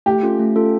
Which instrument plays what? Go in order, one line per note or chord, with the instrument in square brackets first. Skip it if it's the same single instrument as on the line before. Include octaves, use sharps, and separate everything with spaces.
[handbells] A3 [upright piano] G4
[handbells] C#4 F4 A4
A3
C#4 F4 A4